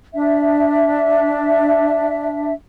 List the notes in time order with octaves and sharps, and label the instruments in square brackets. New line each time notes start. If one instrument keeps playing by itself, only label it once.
[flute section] D4 E5